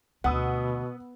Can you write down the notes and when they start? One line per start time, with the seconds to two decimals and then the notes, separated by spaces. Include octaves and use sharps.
0.24 D2 B2 B3 F#5 D#6 E6